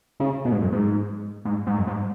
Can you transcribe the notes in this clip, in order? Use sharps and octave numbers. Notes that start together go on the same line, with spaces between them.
C#3
B2
G#2
F#2
G#2
G#2
G#2
F#2
G#2